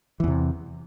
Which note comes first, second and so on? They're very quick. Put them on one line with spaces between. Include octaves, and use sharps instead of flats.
E3 E2 C3